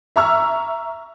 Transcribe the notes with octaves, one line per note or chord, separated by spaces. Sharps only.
E5 A#5 C#6 E6 F6